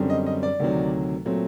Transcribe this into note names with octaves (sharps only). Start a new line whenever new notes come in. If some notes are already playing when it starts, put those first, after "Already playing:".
Already playing: F#2 D3 G3 C4
D#5
D#5
D5
D2 C3 D#3 F#3
A#2 F#3 A3 C4